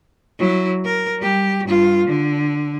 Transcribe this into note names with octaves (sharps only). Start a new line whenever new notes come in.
F#3 E4
A#4
G3 G4
G2 F4
D3